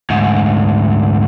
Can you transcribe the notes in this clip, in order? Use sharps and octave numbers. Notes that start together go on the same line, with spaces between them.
D2 G#2